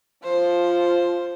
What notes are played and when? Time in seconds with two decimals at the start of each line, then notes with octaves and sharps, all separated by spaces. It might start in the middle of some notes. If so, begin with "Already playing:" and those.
0.24 F3 C5